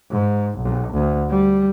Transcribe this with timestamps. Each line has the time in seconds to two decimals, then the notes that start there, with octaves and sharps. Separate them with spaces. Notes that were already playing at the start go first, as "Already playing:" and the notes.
0.11 G#2
0.58 B1
0.93 D2
1.30 G3